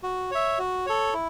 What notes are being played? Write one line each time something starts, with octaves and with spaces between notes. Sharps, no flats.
F#4
C#5 E5
F#4
A4 C#5
E4